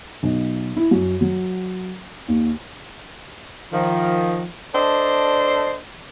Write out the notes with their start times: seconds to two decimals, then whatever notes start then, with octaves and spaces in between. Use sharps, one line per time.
0.23 B1
0.77 E4
0.91 F#2
1.21 F#3
2.28 D#2
3.73 D#3 F3
4.74 D4 A4 C5 D5 D#5